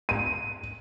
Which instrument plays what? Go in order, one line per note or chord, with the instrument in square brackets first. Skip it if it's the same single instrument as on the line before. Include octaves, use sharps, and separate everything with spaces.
[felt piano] D#7